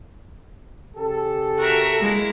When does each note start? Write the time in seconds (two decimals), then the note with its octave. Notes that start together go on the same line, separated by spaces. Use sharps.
0.97 C#3 G4 A4
1.59 F#4 A#4 E5
2.00 G#3 A#3 E4